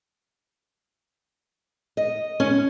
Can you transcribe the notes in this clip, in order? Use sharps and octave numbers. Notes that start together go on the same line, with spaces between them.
D#5
C#4